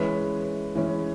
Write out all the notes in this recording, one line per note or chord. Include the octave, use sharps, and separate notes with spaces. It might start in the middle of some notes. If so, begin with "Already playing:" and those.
Already playing: E3 G#3 C#4 B4
E3 G#3 C#4